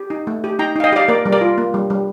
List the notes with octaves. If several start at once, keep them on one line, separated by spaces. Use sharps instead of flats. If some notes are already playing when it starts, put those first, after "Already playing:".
Already playing: G4
D#4
A3
G4
D#4 G5 A#5
D#4 F5
D#5 G5
G4 D5 F5
A#3 A#4 D5
G3
A#4 D5
F4
A#3
G3
G3